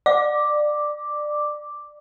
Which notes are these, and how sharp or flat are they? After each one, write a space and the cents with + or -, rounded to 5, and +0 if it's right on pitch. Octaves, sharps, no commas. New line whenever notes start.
D5 +20 D6 +0